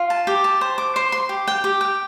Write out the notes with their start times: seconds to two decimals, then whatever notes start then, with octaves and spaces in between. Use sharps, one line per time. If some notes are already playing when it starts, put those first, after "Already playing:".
Already playing: F4
0.10 A5
0.27 G4
0.44 A5
0.61 C5
0.78 D6
0.96 C5
1.12 C6
1.29 G4
1.48 G5
1.64 G4
1.81 G5